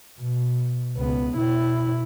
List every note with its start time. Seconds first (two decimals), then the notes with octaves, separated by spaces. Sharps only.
0.21 B2
0.97 C#2 B3
1.37 B2 E4